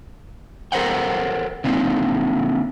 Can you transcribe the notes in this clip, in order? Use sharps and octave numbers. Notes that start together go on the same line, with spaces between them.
A4 A#4 C5 F#5 G5
D3 A#3 C4 D#4